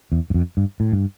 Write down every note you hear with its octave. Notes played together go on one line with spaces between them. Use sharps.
E2
G2
F2
G2
A2
G2